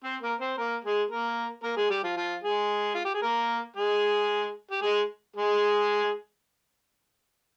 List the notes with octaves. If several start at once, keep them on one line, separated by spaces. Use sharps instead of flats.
C4 C5
A#3 A#4
C4 C5
A#3 A#4
G#3 G#4
A#3 A#4
A#3 A#4
G#3 G#4
G3 G4
F3 F4
F3 F4
G#3 G#4
F4
G4
G#4
A#3 A#4
G#3 G#4
G4
G#3 G#4
G#3 G#4